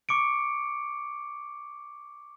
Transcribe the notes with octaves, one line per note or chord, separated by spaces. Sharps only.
C#6 D6 C#7 D7